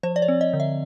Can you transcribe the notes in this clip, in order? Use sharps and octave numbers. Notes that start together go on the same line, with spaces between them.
F3 C5
D5
C#5
C4
D#5
D3
E5